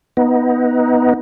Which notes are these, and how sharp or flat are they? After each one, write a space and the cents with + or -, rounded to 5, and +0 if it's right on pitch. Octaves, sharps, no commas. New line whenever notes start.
B3 +0 D#4 +20